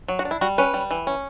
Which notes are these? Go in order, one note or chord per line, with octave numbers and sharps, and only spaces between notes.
F#3
F#4
D4
E4
G3 F#4
C#4 B4
G3
E3
C#4